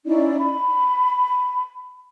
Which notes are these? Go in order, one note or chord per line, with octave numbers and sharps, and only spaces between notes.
C#4 D#4 E4 D5
B5